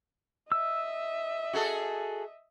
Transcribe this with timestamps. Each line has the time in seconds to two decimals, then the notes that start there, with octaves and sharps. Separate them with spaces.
0.52 D#5 E5 E6
1.53 F#4 G#4 A4